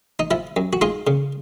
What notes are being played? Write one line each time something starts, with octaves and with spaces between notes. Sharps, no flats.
D#4
F3 E4
F#2
F#4
G#3 D#4 F4
C#3